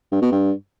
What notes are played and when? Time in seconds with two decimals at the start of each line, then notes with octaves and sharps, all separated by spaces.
0.12 G2
0.22 B2
0.32 G2